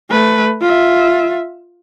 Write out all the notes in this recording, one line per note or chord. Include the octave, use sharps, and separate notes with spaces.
A3 B4
F4 E5